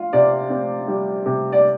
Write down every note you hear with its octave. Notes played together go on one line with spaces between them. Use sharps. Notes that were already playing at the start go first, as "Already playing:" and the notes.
Already playing: F4
C3 D5
C4
G3
C3
D5